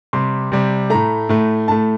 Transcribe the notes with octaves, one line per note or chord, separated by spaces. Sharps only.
C3 G3 C6
C3 G3
A2 A3 A#5
A2 A3
A2 A3 A5